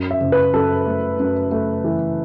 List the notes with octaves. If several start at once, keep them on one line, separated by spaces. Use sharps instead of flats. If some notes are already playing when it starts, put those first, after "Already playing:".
Already playing: F#2
E5
F#1
B4
F#2 A4
A3
F#2
A3
E3